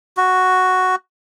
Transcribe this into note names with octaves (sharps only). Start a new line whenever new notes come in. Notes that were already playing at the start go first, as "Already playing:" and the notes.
F#4